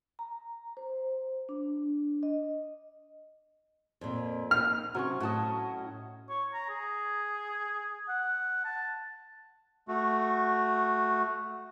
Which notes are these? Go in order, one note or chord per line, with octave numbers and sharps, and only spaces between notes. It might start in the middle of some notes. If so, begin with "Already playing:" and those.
A#5
C5
D4
D#5
F2 A#2
D#4 F6
C3 F#3 C#4 C#6
A2 F#4 D#5 A5
C#5
A#5
G#4
F#5
A5
A3 F#4